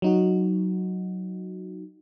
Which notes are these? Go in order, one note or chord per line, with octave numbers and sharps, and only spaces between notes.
F#3 D#4 F#4